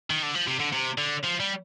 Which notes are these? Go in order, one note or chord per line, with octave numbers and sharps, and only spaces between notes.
D#3
D3
F3
C3
D3
C3
D3
F3
G3